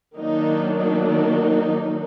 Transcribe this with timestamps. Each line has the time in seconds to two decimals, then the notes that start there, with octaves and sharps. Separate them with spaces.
0.16 D#3 F#3 A#3 D4 D#4
0.77 D#4
1.07 D#4